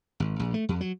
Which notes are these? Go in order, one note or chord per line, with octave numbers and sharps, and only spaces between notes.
G#1
A#1
A3
F2
F#3